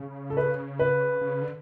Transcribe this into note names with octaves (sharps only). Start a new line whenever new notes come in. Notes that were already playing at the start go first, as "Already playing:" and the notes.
Already playing: C#3
A4
B4
B4
C#3
D3